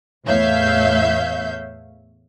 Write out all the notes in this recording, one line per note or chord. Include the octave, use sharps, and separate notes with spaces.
E2 A2 C#5 E5 F5 G6